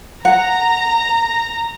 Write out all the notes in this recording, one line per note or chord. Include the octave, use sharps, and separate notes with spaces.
F#5 A#5